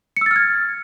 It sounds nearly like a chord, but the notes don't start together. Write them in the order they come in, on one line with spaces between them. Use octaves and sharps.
C#7 E6 A6 F6 G#6